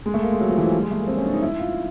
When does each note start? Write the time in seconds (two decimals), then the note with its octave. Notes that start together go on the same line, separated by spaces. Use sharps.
0.06 G#3
0.14 A3
0.23 A#3
0.32 G#3
0.41 F#3
0.49 F3
0.58 E3
0.65 F3
0.74 G3
0.82 G#3
0.91 A3
1.00 A#3
1.08 C4
1.17 C#4
1.26 D4
1.34 D#4
1.42 E4
1.59 F4